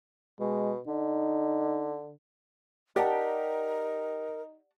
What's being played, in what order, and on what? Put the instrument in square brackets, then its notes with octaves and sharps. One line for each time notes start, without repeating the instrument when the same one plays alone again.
[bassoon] B2 [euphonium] G#3
[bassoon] D3 [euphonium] D#4
[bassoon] D#4 [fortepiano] G4 [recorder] A#4 [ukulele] D5 F#5 A5